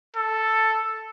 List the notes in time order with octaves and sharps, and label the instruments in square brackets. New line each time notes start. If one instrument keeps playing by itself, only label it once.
[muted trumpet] A4